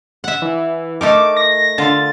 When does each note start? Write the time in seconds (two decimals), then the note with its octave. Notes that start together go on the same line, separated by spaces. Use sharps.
0.24 E5 F#5
0.42 E3
1.01 A3 D#4 A#4 D6
1.37 A#6
1.78 D3 F4 A6